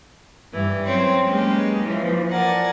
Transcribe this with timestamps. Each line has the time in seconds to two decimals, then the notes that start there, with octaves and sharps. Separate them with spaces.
0.53 G2 E3
0.86 F#3 C4 C#4
1.24 G#3 A#3 C#4 G4 B4
1.83 E3 F3
2.30 A#4 D5 F#5 G#5 A5